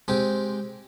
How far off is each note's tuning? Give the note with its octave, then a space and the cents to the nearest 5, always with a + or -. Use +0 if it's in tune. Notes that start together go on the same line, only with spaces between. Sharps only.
G#3 +0 C4 +0 G4 -10